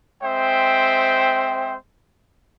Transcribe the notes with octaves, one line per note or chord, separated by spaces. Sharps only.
G#3 C4 C5 E5 G5